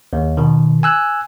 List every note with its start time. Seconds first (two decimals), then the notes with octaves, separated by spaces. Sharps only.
0.13 D#2
0.37 B2 D#3
0.83 G#5 E6 F#6